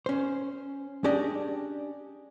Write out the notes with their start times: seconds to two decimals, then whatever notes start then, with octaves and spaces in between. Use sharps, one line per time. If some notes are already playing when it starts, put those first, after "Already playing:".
0.06 C#4 C5
1.04 C#4 D4 G4 G#4 D5 D#5